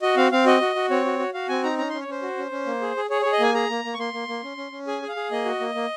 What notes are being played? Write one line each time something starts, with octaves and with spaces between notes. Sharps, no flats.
F#4 D#5
C4 F5
C4 F5
F#4 D#5
F#4
F#4
C4 C#5
F#4
F#4
F#4 F5
C4 G#5
D#4 A#5
C#4 A#5
C#4 C6
C#5
C#4 C5
F#4
C#4
C#4
A#3
G#4
G#4
G#4 C#5
G#4 C#5
D#5
A#3 G#5
G#4 A#5
A#3
A#3
C#6
A#3 C6
A#3
A#3
C#4
C#4
C#4
G#4 G#5
G#4
F5
G#4
A#3 D#5
F#4
A#3
A#3